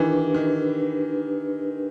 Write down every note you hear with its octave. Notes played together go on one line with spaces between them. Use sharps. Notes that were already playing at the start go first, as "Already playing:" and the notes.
Already playing: D#3 E3 D4 G4 B4
D#3